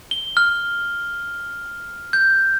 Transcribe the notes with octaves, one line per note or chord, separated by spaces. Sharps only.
G7
F6
G6